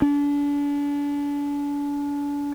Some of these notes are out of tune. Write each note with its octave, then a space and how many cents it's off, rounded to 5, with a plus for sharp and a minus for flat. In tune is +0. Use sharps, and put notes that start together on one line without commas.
D4 -35